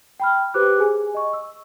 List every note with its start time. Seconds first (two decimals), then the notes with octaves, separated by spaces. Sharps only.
0.20 G5 B5 F6
0.54 G4 B4 C5 D6 F#6
0.78 G#4 G#5
1.14 D#5 C#6
1.33 E6